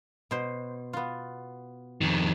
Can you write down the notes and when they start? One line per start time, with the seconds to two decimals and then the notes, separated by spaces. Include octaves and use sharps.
0.31 B2 C5
0.93 B3 F4
2.01 F2 D#3